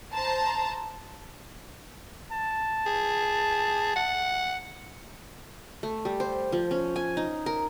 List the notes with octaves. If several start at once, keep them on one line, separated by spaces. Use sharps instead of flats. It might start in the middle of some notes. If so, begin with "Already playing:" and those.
C5 A5 A#5
A5
G#4
F#5
A3
G3
C5
F3
C#4
G#5
D#4
A#4